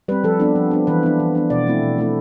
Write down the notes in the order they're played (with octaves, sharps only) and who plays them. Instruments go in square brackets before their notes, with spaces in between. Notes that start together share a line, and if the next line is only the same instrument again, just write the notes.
[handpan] G3 B4
C4
F3 A4
B3 D4
F3
B3 D4
E3 B4
B3 D4
E3
B3 D4
B2 D5
A3 C4 E4
B2
A3 C4 E4